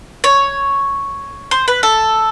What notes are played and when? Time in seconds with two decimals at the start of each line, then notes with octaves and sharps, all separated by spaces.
0.24 C#5
1.51 C5
1.68 B4
1.83 A4